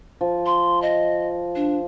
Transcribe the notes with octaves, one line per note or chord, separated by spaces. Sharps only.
F3
C6
D#5
D4